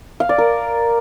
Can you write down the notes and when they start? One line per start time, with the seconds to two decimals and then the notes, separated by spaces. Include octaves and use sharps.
0.20 F5
0.29 D5
0.38 A#4